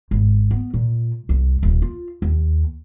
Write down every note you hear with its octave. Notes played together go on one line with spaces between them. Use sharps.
G#1
B3
A#2
C2
D#1
F4
D#2